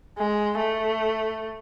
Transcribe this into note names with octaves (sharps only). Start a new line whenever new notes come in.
G#3
A3